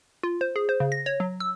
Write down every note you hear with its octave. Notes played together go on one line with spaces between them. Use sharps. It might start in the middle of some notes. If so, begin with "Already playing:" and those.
F4
C5
G#4
C5
C#3
A#6
C#5
F#3
E6